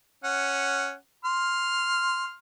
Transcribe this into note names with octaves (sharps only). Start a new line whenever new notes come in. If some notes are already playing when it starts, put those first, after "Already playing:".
C#4 F#5
C6 F6